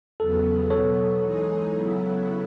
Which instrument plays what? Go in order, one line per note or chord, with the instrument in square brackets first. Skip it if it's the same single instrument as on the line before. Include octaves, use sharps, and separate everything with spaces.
[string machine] E2 C#3 F#3 B3 [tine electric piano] A4
[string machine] B2 F#3 B3 [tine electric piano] A4 C#5
[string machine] E3 G#3 D#4 G#4
C#3 F#3 B3 E4